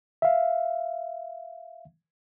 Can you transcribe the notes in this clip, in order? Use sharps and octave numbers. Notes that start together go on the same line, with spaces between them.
E5 F5